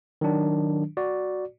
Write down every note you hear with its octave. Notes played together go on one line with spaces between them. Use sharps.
D#3 F#3 D4
F#4 D5